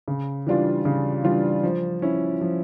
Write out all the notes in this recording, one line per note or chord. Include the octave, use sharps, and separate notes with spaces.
C#3
E3 G3 D4 F4
C#3
E3 G3 D4 F4
F3
C#4 E4
F3